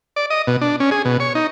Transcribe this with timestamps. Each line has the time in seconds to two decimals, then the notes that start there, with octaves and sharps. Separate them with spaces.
0.16 D5
0.30 D#5
0.47 B2
0.61 D4
0.80 C#4
0.91 G#4
1.05 B2
1.20 C#5
1.35 D#4